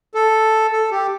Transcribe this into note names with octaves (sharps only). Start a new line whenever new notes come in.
A4
A4
G4